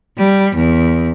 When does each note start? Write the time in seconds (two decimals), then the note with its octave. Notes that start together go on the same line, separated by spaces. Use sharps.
0.18 G3
0.55 E2